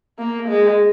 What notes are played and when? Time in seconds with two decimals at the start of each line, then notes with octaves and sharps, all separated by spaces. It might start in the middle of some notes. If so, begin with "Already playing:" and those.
0.19 A#3
0.49 G#3